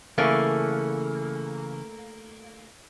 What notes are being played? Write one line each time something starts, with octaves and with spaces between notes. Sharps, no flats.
C#3 E3 A3 A#3 C#4